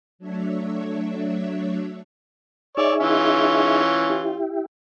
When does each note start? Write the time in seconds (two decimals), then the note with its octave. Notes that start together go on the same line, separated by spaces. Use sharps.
0.19 F#3 A3 D4 C#5 E5
2.77 D#4 G#4 C#5 D5 E5
3.01 E3 C#4 F4
4.10 E4 G4